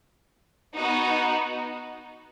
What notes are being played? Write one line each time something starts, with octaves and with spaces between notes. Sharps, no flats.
B3 D#4 F#4